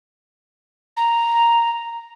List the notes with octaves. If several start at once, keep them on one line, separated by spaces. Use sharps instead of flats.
A#5